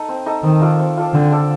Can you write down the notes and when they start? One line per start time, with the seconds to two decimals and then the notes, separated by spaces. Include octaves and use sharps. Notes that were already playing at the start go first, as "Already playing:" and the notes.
Already playing: D#4 A4 D#5
0.08 C4
0.26 D#4 A4 D#5
0.43 D#3 C4
0.61 F4 A4 D5
0.79 C4
0.97 F4 A4 D5
1.14 D3 C4
1.32 F4 A4 D5